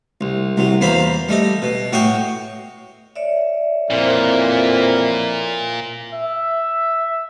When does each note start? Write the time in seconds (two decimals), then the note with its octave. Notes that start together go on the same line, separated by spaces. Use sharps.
0.21 C2
0.57 C2 F#3
0.81 E2 A#3 C5 B5
1.29 G3 A3 D#5
1.62 B2
1.93 A2 F#4 G5 C#6 D#6
3.16 C#5 D5 E5
3.91 F2 A#2 E3 A#3 C4
6.13 E5